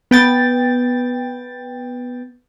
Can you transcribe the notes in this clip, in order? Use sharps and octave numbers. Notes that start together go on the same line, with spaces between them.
B3 G5 A6